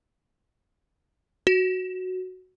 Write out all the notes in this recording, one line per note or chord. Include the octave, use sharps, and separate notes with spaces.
F#4